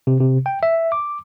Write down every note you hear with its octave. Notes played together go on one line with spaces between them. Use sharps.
C3
C3
G5
E5
D6